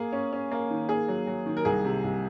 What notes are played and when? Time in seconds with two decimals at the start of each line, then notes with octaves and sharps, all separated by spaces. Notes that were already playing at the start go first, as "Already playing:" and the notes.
Already playing: A#3 G#4
0.13 C#4
0.33 C#4
0.51 A#3
0.70 D#3
0.89 A#3 G#4
1.08 F#3
1.27 F#3
1.46 D#3
1.57 A#4
1.65 C2 G#4
1.84 C3
2.04 C2